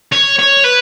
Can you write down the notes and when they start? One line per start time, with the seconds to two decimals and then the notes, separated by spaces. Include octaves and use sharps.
0.12 C#5
0.39 C#5
0.64 B4